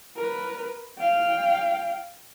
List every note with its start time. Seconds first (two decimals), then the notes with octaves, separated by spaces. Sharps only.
0.16 A#4 B4
0.98 F5 G5